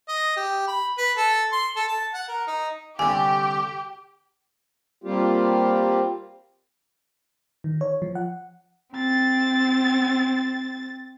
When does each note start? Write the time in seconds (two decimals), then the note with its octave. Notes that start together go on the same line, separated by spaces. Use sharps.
0.08 D#5
0.37 G4
0.68 B5
0.98 B4
1.17 A4
1.52 C6
1.76 A4
1.88 A5
2.14 F#5
2.29 A#4
2.47 D#4
2.99 C2 D3 G4 G#5
5.04 G3 A#3 C4 F4 G4
7.64 D#3
7.81 C#5
8.02 F3
8.15 F#5
8.93 C4 A6